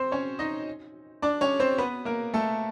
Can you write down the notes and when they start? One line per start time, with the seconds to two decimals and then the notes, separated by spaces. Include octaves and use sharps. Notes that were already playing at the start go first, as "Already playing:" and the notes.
Already playing: C4 C5
0.12 C#4 C#5
0.39 D#4 D#5
1.22 D4 D5
1.41 C#4 C#5
1.60 C4 C5
1.78 B3 B4
2.05 A#3 A#4
2.34 A3 A4